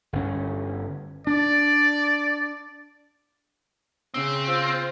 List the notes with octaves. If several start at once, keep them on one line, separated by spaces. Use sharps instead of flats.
G1 C#4
D4 D5
C#3 C4
F4 C5